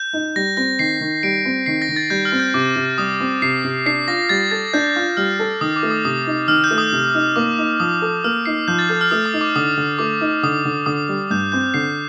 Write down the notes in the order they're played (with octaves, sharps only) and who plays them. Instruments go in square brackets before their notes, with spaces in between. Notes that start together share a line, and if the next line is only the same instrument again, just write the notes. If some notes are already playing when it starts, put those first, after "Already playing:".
Already playing: [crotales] G6
[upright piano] D#4
[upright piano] G3 [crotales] A#6
[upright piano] C4 [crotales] A#6
[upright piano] D#3 [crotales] C7
[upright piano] D#3
[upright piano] G3 [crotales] D7
[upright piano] C4
[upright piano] D#3 [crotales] C7
[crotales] A#6
[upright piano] D#3
[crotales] A6
[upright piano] G3 [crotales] G6
[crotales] F6
[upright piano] C4
[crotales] G6
[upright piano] C3 [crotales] D6
[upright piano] C3
[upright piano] G3 [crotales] D#6
[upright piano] C4
[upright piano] C3 [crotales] C7
[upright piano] C3
[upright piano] D4 [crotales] C7
[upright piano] F4 [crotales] A#6
[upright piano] G3 [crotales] A6
[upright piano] A4 [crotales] A6
[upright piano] D4 [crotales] G6
[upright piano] F4
[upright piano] G3 [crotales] F6
[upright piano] A4
[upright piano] D#3 [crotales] D#6
[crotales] D6
[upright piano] A3
[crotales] D#6
[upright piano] C3 [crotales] D#6
[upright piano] D#4
[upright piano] D#3 [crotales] F6
[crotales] G6
[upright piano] A3
[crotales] D#6
[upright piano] C3
D#4
[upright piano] A#3 [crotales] D6
[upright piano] D#4
[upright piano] F3 [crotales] D#6
[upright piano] A4
[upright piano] A#3 [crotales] F6
[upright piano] D#4 [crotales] C7
[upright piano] F3 [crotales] G6
[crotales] A6
[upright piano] A4 [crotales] G6
[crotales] F6
[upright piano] A3 [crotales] D#6
[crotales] D#6
[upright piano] D#4
[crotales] D6
[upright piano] D3 [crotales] D#6
[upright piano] D3
[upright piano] A3 [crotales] D6
[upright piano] D#4
[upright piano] D3 [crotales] D#6
[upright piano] D3
[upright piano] D3 [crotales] D#6
[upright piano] G3
[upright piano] G2 [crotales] G6
[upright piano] C4 [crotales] G6
[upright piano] D3 [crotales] C7